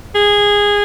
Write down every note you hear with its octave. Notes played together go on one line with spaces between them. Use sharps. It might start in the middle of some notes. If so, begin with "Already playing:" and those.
G#4